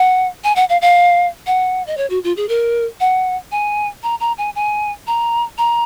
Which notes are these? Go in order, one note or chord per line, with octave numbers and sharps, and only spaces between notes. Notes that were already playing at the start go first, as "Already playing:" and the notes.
Already playing: F#5
G#5
F#5
F5
F5
F#5
D#5
C#5
F#4
F4
G#4
A#4
F#5
G#5
A#5
A#5
G#5
G#5
A#5
A#5